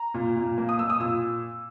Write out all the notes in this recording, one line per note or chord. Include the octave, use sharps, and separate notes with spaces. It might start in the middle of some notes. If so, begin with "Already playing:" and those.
Already playing: A#5
A#2
A#2
A#3
D#6
A#3 E6
D#6
A#2 E6